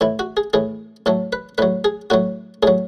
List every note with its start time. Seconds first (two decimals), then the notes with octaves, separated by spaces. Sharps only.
0.01 A2 E3 E4
0.19 F#4
0.37 G#4
0.53 A2 E3 G#4
1.06 A2 F#3 A4
1.33 B4
1.58 A2 F#3 B4
1.84 G#4
2.10 A2 F#3 F#4
2.63 A2 F#3 G#4